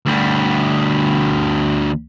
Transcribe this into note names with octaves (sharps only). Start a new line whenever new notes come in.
D2 G3